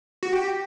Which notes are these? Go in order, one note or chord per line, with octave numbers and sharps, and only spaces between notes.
F#4
G4